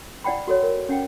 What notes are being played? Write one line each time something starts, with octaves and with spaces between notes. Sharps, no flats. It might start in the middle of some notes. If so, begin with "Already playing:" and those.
E4 D5 F#5 G5 B5
F#4 A4 C#5
A#4
C#4 F#5 G5